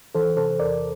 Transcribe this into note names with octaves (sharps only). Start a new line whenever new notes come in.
E3 A4 C5
C3 A4 C5
E2 A#4 D5